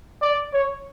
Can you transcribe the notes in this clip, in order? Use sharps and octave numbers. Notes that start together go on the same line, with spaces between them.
D5
C#5